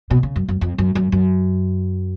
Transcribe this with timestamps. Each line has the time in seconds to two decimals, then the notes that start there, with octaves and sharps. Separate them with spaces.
0.10 B2
0.23 C#3
0.36 F#2
0.48 F#2
0.61 F2
0.78 F#2
0.95 F#2
1.12 F#2